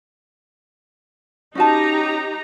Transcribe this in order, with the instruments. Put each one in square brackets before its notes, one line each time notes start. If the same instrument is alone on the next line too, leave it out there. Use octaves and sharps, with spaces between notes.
[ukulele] C#4 F#4 A5 [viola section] D#4 G4 A#5